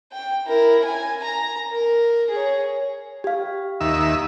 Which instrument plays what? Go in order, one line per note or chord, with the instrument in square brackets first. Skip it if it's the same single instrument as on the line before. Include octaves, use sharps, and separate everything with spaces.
[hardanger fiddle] G5
E4 A#4
G#5
A#5
A#4
G#4 C#5
[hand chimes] G4 F5
[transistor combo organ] D#2 E5